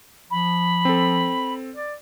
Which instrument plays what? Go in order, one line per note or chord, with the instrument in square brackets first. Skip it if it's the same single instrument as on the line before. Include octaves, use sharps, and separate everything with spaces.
[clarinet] F3 [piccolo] B5
[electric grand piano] C4 A4
[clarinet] D5